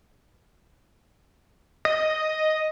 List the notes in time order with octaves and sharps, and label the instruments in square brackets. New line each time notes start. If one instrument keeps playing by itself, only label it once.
[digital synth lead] D#5